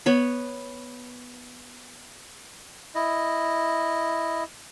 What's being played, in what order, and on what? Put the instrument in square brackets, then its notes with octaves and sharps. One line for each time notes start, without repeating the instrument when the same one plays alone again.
[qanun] B3 C#5 B5
[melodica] E4 D#5